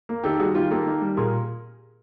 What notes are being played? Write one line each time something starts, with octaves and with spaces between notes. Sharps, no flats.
A#3
D#3 G4 A4
G3 F#4 G#4
D#3 F4 G4
A#3 G4 A4
D#3
G3
A#2 G#4 A#4